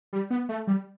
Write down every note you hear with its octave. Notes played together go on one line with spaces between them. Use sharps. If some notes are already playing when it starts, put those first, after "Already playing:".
G3
B3
A3
G3